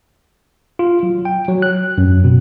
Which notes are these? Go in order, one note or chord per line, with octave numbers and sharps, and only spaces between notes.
F4
F#3
G5
F#3
F#6
F#2
B2